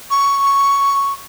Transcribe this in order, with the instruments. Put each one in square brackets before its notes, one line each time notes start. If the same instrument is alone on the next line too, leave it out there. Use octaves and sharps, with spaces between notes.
[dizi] C#6